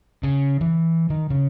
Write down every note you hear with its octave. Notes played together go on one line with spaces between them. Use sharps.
C#3
E3
D#3
C#3